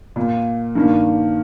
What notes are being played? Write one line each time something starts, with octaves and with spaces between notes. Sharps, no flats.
A#2 A#3
G2 D#3 A#3